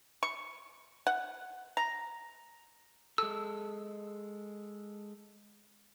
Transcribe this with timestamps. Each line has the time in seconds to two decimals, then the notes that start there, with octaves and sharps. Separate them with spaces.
0.23 C#6
1.07 F#5
1.77 A#5
3.18 G#3 A4 E6